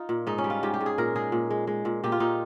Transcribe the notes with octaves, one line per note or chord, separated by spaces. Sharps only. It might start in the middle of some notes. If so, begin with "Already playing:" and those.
Already playing: D#4 F4
A#2
G#2 D#4
C#4
G3
F4
G#2 G4
G4
G#2
G#4
A#2 A#4
G#3 G#4
A#2
G#3
G#3
A#2
A#2 G4
F4
A#2 D#4